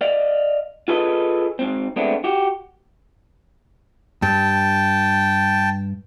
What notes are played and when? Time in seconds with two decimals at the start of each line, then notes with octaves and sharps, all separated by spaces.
0.01 D5 D#5 F5
0.88 F4 G#4 A4 B4 D#5
1.59 G#2 C4
1.96 G#3 A3 B3 C4 D4
2.24 F#4 G4
4.22 G2 G5 A5